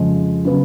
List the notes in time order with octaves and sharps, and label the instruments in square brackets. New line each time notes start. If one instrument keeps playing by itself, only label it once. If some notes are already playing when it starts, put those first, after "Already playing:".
Already playing: [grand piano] F2 C#3 F3 G#3
C#3 F#3 B3